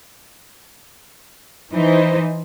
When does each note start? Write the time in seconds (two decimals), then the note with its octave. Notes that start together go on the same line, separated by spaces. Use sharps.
1.72 E3 D#4 C5